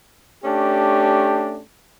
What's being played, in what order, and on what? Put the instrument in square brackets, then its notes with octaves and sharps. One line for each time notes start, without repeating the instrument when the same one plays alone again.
[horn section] A3 C#4 D4 G4